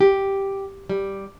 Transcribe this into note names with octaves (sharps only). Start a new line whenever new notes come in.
G4
G3